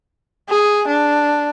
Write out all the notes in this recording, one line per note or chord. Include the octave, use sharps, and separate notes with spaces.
G#4
D4